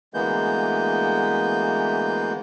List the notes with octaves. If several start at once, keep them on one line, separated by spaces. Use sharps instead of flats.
D2 E3 G#3 A#3 B3 G6